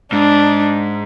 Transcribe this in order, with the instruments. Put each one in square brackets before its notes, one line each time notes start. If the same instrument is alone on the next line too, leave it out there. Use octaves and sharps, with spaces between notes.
[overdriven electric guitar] G#2 [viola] D4